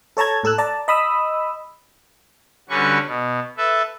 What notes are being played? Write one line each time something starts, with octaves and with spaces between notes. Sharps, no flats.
A4 C#5 A5 A#5 G#6
A2 A4 E6 F#6
D5 A5 A#5
D#5 B5 D#6 E6
D3 G3 C#4 F#4 B4 C#6
B2
A4 B4 E5